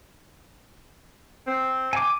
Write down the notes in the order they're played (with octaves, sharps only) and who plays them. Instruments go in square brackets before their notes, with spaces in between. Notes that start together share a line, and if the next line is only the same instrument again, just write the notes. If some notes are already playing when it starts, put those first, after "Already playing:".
[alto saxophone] C4
[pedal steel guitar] G#5 D6